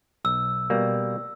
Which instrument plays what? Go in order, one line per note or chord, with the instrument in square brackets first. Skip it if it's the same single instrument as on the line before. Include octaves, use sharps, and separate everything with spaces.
[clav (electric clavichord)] B1 [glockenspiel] E6
[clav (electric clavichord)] B2 G3 A#3